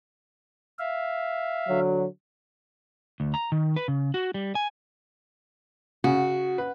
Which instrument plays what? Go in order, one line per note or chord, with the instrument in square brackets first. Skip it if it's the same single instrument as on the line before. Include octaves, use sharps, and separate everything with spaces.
[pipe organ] E5 F5
[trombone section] D3 F#3
[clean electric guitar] D2
A#5
D#3
B4
C#3
F#4
G3
G#5
[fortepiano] C#3 [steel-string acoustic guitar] F#4
[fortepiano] B4